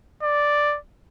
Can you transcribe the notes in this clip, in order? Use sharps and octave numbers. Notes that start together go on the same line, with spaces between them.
D5